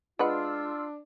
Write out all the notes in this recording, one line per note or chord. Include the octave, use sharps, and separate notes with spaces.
G#3 D4 F4 B4 F#5 E6